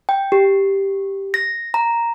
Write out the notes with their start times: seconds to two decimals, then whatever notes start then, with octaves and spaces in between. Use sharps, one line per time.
0.09 G5
0.32 G4
1.34 A#6
1.74 A#5